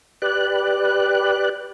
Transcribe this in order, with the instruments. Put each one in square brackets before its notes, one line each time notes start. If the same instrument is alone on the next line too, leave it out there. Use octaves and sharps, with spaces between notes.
[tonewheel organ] G4 B4 D5 F#6